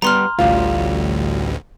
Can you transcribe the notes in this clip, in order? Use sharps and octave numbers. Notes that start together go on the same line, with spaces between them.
G3 B3 A#5 C6 F6
A1 D2 G3 F4 F5